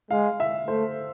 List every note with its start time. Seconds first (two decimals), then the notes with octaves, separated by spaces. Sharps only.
0.11 G#3 F5
0.40 E5
0.68 A3 C5